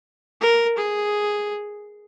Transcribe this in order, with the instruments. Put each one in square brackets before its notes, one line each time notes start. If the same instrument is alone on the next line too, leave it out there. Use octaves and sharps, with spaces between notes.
[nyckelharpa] A#4
G#4